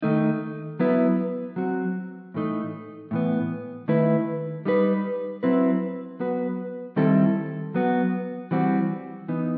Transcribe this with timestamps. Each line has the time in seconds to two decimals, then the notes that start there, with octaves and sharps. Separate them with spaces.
0.02 D#3 A3 D#4
0.79 F#3 B3 E4 B4
1.56 F#3 C4 F#4
2.34 A2 E3 A3 D#4
3.11 A2 E3 B3
3.88 D#3 A3 E4 B4
4.65 G3 D#4 G4 B4
5.43 F#3 C4 E4 B4
6.20 F#3 B3 F#4 B4
6.96 D#3 G3 C4 E4 A4
7.74 F#3 B3 F#4
8.51 E3 G3 C4 F#4
9.29 E3 B3 D#4